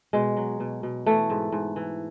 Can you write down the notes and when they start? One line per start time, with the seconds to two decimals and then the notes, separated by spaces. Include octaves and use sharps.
0.13 B2 G#3
0.37 F#3
0.60 B2
0.83 B2
1.06 E3 A3
1.30 G#2
1.52 G#2
1.76 E3